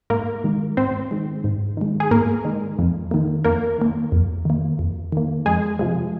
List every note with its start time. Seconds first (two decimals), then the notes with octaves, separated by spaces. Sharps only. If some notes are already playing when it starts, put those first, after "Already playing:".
0.10 G#2 A#3 A#4
0.44 D#3 G#3
0.77 G#2 C4 C5
1.11 D#3 G#3
1.44 G#2
1.77 D#3 G#3
2.00 G#4
2.11 G#2 A#3 A#4
2.45 D#3 G#3
2.79 F2
3.11 D#3 A#3
3.45 F2 A#3 A#4
3.78 D#3 A#3
4.12 F2
4.45 D#3 A#3
4.79 F2
5.12 D#3 A#3
5.46 F2 G#3 G#4
5.79 C3 F3 G#3